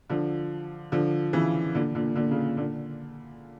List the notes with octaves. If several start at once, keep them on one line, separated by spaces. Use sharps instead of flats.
D3 F3
D3 F3
C#3 E3
A#2 D3
A#2 D3
A#2 D3
C#3
A#2
A#2 D3